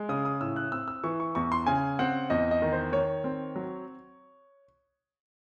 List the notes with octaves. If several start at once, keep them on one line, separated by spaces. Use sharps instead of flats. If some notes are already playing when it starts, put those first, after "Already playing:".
Already playing: G#3
C#3 D#6
D#6
A2 E6
F#6
C4 E6
E6
E3 C#6
C#6
E2 C#6
C6
C#3 G#5
C4 F#5
E2 D#5
D#5
D#3
C5
D#3 C#5
C4
F#3